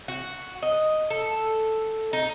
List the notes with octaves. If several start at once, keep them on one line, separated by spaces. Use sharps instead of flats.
F#4
D#5
A4
D#4